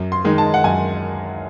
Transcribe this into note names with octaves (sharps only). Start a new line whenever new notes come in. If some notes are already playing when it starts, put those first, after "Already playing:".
Already playing: F#2
C6
D#3 G#3 D#4
A5
F#5
F#2 G#5